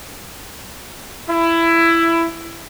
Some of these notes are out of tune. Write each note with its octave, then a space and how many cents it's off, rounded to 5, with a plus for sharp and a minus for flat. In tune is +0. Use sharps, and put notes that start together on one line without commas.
E4 +15